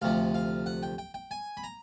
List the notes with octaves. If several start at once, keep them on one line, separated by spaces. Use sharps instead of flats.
D2 C3 F3 F5
F5
F#5
G5
G5
G5
G#5
B5
A#5